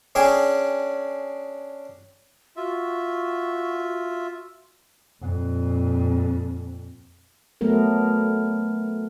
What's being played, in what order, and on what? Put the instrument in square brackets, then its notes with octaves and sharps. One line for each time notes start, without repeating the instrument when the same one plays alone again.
[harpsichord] C#4 D4 G#4 G5 G#5
[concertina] F4 E5 [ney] F#4
[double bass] F2 A#2
[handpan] F#3 A3 B3 A#4